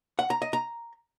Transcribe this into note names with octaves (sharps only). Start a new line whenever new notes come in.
F#5
A#5
D#5
A#5